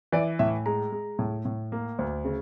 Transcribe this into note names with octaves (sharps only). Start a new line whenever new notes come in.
E3 D5
A2 E5
G#3 A#5
G#3
A2
A2
A#3
D2
C#3